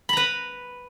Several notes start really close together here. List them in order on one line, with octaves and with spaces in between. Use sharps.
B5 A#5 B4